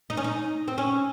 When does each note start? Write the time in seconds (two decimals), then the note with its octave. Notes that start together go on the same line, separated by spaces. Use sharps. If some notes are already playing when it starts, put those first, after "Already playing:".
0.10 D#4
0.17 C#4
0.24 D#4
0.68 C4
0.78 C#4